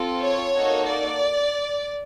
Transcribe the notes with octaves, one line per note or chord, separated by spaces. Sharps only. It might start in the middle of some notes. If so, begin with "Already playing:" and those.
Already playing: C4 F4 A4
C#5
A#3 D#4 F#4 A4
D5